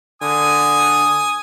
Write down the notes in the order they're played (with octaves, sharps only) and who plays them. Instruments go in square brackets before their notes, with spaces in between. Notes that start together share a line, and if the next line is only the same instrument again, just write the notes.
[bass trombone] D3 [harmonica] G#5 D#6